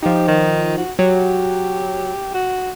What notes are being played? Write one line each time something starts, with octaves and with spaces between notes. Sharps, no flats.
F3 D#4 G4
D#3
F#4
F#3 G4
F#4